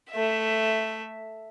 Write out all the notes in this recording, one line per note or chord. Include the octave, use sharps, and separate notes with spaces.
A3 E5